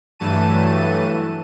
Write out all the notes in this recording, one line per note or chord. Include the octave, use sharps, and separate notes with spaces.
G2 E3 F#3 A3 A5 D#7